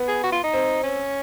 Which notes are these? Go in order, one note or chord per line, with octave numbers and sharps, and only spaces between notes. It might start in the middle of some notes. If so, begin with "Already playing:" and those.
Already playing: B3
G#4
F#4
F4
D#4
C4
C#4